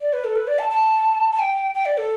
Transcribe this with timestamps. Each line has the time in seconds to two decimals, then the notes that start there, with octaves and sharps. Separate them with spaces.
0.01 D5
0.13 B4
0.24 A4
0.36 B4
0.48 D5
0.59 A5
0.70 A5
1.32 A5
1.39 G5
1.75 G5
1.85 D5
1.98 A4